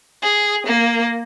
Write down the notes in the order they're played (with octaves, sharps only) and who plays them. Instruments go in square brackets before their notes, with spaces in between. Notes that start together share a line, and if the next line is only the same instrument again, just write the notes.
[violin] G#4
A#3